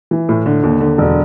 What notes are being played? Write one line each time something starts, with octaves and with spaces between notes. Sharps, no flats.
E3
A2
D3
D#2
D3
E1